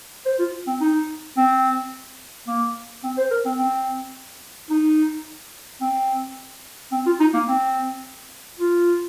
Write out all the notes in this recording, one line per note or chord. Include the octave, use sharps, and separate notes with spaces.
C5
F4
C4
D#4
C4
A#3
C4
C5
A#4
C4
C4
D#4
C4
C4
F4
D#4
A#3
C4
F4